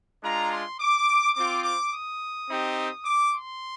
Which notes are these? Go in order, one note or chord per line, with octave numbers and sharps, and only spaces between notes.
G#3 D4 F4 A#5
C6
D6
C4 F4 D6
D6
D#6
C4 D#4 G4
D6
C6